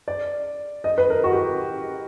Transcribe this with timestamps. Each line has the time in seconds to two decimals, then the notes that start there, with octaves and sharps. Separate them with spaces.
0.08 D5
0.84 D#5
0.98 B4
1.10 A#4
1.24 F#4
1.32 G4